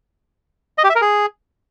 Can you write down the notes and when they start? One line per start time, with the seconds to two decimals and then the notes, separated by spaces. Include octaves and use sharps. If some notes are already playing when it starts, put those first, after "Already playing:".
0.78 D#5
0.84 G4
0.90 E5
0.95 A#4
1.01 G#4